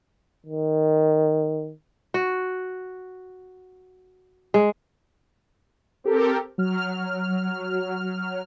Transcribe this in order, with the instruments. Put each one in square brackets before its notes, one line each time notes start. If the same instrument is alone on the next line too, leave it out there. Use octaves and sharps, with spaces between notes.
[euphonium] D#3
[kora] F#4
G#3
[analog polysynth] C4 G4 A4 A#4
F#3 F6